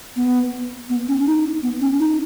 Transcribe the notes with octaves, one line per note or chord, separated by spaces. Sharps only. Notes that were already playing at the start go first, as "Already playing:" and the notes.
B3
B3
C#4
D#4
B3
C#4
D#4